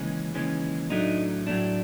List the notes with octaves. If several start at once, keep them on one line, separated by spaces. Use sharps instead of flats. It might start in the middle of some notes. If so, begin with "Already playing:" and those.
Already playing: D#2 C#3 E3 G#3 C#4
D#2 C#3 E3 G#3 C#4
A2 F#3 A3 D4 D#4
A2 F#3 A3 D4